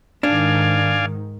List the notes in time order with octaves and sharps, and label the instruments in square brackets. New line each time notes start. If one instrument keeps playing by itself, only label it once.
[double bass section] G#2 D#3 [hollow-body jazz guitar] D4 [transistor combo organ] D5 F5 G#5